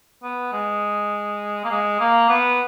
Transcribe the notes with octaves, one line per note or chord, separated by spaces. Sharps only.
B3
G#3
A#3
G#3
A#3
B3